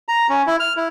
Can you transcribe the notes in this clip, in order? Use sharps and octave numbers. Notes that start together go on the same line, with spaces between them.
A#5
C#4
E4
F6
E4